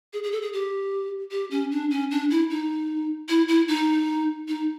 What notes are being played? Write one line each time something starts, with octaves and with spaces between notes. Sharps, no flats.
G#4
G#4
A4
G#4
G4
G4
C#4
D4
C#4
D4
E4
D#4
E4
E4
D#4
D#4